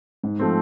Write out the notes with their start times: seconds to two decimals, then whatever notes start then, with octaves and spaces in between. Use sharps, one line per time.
0.24 G#2
0.39 F3 A3 C4